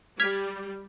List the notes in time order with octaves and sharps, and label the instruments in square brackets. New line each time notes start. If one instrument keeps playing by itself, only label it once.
[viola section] G3 [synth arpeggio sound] F6 G#6 B6